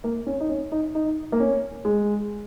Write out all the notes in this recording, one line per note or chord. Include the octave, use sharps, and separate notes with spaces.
A#3
C#4
D#4
C#4
D#4
D#4
A#3
C#4
G#3